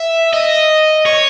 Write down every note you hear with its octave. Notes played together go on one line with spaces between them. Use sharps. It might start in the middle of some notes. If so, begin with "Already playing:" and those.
Already playing: E5
D#5
C#5